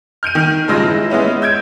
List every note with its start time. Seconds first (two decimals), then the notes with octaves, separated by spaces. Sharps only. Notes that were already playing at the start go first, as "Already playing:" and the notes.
0.23 F6 G6 D7 D#7
0.35 D#3
0.68 G2 C#3 G#3 F4 E6 A#6
0.82 E3
1.10 G#3 B3 C#4 E4
1.42 E6 G6 G#6 D7